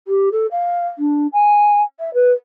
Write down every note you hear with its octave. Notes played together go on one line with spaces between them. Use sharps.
G4
A4
F5
D4
G#5
E5
B4